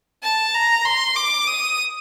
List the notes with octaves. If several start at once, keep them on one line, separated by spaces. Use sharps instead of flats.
A5
A#5
C6
D6
D#6